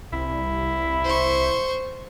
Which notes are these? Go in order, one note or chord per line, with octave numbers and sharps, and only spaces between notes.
C2 E4
C5 C#6